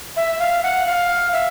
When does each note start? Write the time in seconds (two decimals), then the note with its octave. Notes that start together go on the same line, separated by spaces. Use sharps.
0.17 E5
0.39 F5
0.63 F#5
0.87 F5
1.33 E5